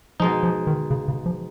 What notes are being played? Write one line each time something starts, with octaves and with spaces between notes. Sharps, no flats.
B2 F3 G#3 D#4
F3
D#3
C#3
C#3
F3